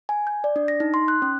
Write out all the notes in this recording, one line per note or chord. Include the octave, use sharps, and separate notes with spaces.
G#5
G6
D5
D4
A#6
D#4
C6
F#6
C#4